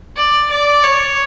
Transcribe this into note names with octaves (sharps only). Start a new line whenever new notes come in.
D5
D5
C#5